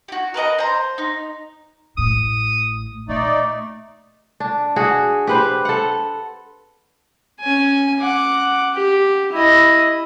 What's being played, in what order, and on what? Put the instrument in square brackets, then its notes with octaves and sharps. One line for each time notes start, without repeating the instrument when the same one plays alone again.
[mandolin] F#4 G4
A#4 B4 D#5 A#5
C5 A#5
D#4
[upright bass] A1 A2 [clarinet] D#6
[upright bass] A#2 [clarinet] A3 [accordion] D#4 D5
[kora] D4
F#4 G#4
G4 B4 C5
A4 F#5
[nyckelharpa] C#4 G#5
F#5 D6
G4
E4 D#5